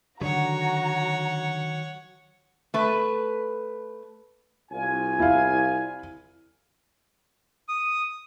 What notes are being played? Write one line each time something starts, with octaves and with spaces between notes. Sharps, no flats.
D3 D#3 F#3 F#4 C#5 F#5 A#5
A3 B4
C2 F4 G#5
E4 F5
D#6